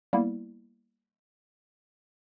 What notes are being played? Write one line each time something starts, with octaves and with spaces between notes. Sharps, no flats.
G3 A#3 B3 E4